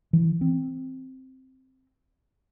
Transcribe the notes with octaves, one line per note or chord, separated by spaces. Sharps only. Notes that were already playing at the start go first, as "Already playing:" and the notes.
E3
C4